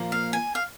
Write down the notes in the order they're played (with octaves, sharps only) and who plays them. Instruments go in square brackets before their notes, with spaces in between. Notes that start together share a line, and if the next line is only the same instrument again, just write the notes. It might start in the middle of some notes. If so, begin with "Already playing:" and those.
Already playing: [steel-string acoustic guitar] A#2 F3 A#3
[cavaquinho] F5
G#5
F5